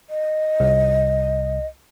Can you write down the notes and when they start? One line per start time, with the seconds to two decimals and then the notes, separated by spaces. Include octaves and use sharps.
0.10 D#5
0.60 C2